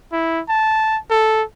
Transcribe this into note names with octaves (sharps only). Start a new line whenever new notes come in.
E4
A5
A4